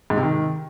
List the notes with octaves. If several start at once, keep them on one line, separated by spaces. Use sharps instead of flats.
G#2
C3
D#3